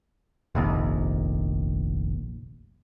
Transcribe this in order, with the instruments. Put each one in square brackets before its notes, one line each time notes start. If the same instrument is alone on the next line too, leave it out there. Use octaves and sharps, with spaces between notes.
[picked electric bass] F1 A#1 D#2